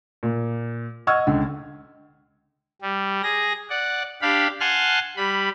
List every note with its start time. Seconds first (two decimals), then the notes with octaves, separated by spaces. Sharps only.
0.23 A#2
1.07 D#5 F#5 C#6 E6 F6 G#6
1.27 C#2 D3
2.81 G3
3.23 G#4 A#6
3.69 D5 F#5
4.22 D4 G4 F5 B5
4.60 F#5 G#5 A5 C6 F6 F#6
5.17 G3 B5